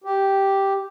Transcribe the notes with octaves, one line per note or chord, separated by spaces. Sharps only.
G4